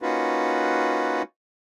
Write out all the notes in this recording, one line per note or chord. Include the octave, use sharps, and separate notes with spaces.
A#3 C#4 D#4 F4 F#4 B4